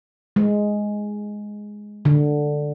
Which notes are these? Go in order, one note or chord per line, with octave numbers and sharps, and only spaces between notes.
G#3
D3